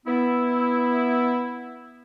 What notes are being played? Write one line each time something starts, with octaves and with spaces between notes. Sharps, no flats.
B3 E4